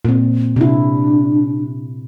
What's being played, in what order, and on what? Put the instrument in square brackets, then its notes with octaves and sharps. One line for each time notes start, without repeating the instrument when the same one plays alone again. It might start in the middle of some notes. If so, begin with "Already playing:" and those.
[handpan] A#2 C4
[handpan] C3 E4 [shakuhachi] D4